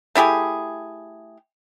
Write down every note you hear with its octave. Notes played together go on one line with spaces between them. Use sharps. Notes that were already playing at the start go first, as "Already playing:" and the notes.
A3 E4 G4 G#4